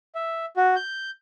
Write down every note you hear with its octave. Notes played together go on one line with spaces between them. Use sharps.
E5
F#4
G6